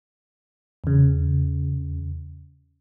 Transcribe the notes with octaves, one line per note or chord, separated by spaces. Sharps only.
E2 C#3